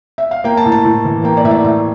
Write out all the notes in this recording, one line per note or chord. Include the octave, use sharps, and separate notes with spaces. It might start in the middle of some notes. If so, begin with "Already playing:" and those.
E5
F5
A#3 G5
A5
A2
A5
A2
E3
A#3 G5
D5
A2 E5
D5
A2 E5